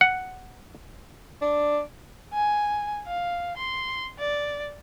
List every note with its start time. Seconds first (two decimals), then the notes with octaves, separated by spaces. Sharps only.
0.01 F#5
1.42 D4
2.33 G#5
3.07 F5
3.57 C6
4.19 D5